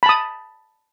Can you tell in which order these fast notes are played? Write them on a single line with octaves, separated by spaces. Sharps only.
B5 A5 D#6